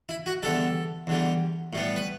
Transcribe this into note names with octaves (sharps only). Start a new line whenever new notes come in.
E4
F#4
E2 D3 G3 A4
E2 D3 G3
A2 G3 B3
B4